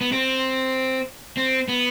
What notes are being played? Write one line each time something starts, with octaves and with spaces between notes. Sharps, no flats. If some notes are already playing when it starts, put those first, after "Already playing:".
B3
C4
C4
B3